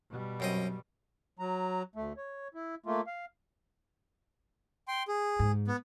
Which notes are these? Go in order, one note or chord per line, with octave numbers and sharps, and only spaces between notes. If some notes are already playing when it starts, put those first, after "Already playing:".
B2 G3
F#2 C4 D#5
F#3 A#5
D2 A3
C#5
E4
A3 A#3 F4
F5
G5 C6
G#4
G#2
B3